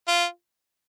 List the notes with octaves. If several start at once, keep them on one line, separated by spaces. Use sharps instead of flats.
F4